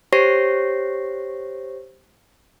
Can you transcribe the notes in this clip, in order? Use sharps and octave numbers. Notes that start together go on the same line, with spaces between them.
G4 C5 C#5 C#6 A#6 C7